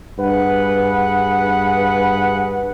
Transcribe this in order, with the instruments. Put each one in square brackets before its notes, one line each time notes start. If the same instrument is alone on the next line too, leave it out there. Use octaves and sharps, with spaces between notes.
[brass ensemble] G2 G#4 B4 F#5